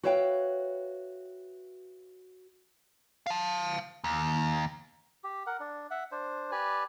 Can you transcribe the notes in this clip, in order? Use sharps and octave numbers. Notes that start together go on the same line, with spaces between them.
F#4 B4 C#5 E5 F5 G5
F5 A5
D#2
G4
A#4 F#5
D4
E5 F#5
D4 C5
G4 B4 D5 G#5